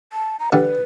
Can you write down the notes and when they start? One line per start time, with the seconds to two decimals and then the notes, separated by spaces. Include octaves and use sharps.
0.13 A5
0.40 A#5
0.52 D3 G3 B4